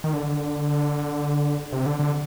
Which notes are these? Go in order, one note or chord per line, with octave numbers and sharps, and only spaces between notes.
D#3
D3
C3
D3
D3